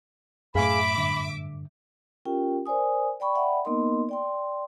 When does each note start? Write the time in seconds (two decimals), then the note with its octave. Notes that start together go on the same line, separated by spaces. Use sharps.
0.55 F#2 A2 G#4 E5 F5 G#5 B5 D6
0.95 G2 D3
2.25 C#4 F4 G4 A#4 G5
2.66 A#4 C5 D5 G#5 D#6
3.20 D5 G5 B5 C#6
3.35 D5 E5 F#5 G5 B5
3.65 A#3 B3 D#4 A#4 D#5 C6
4.09 D5 G5 C6